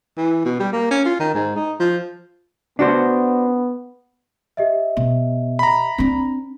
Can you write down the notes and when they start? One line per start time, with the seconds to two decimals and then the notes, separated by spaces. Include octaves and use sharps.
0.17 E3
0.45 B2
0.60 G3
0.73 A#3
0.91 C#4
1.05 F4
1.19 D#3
1.34 G#2
1.56 D#4
1.80 F3
2.79 B3 D4 F#4 C5
4.57 G4 D#5 E5
4.97 B2
5.59 A#5 B5
5.98 C4 D4